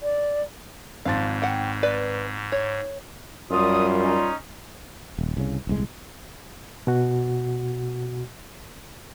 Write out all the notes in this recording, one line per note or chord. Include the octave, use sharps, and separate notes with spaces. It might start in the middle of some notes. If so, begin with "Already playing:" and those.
D5
G#1 G#2 F3 F5 A6
F#5 G5
B4 D5
C#5
F#2 A#2 G3 F4 D#6
C#4 D#4
D#1
C2 C#3
D#1 C2 G#3
B2 F#4